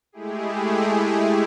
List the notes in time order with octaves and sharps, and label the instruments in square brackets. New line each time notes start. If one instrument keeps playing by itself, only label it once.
[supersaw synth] G#3 A3 E4 G4 G#4